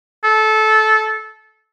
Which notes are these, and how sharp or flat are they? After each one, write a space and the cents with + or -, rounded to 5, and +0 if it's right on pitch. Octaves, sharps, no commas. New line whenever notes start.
A4 -20